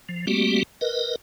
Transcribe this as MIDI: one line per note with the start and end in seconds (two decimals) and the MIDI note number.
0.09 0.26 53
0.27 0.63 55
0.27 0.63 57
0.27 0.63 58
0.27 0.63 60
0.27 0.63 66
0.27 0.63 67
0.81 1.16 70
0.81 1.16 71
0.81 1.16 75